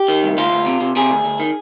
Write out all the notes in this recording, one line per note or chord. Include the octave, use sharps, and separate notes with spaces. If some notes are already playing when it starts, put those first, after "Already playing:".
Already playing: G4
D#3
C2
D2 F4
D2
C3
C3
C3 G#4
D2
D2
D#3